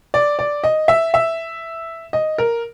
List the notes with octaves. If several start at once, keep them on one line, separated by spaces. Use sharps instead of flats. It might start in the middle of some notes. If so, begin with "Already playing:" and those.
D5
D5
D#5
E5
E5
D#5
A#4